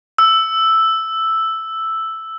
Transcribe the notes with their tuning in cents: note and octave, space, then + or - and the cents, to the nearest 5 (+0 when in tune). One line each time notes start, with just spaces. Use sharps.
E6 +0